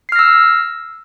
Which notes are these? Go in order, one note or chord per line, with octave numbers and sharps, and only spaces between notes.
E6 F6 A#6 C7